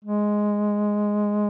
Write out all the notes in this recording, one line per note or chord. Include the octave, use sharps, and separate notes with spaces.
G#3